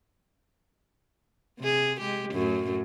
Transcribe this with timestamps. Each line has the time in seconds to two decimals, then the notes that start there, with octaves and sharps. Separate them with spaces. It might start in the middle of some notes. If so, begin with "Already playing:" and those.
1.59 C3 G#4
2.01 G#3 G4
2.33 F#2 A2 F#3